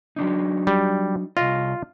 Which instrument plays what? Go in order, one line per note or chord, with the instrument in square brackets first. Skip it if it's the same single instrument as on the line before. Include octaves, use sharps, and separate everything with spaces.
[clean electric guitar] F#3 D4 D#4
[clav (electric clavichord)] G3
[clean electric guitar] C2 G2 D#5 [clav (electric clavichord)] F4